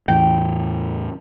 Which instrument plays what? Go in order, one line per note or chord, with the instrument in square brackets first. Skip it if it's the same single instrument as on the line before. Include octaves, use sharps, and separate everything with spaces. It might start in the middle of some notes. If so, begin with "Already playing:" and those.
[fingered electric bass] E2 A2 E3 [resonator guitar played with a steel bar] G5